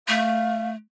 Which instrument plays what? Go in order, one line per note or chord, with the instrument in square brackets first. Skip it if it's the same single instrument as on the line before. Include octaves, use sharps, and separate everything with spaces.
[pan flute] A3 [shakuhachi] F5